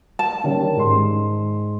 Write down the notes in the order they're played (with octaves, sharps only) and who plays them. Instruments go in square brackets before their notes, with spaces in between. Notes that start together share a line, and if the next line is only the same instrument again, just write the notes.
[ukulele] A5
[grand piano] D#3 G3 C#4
G#2 C6